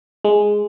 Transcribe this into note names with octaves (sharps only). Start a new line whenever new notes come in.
G#3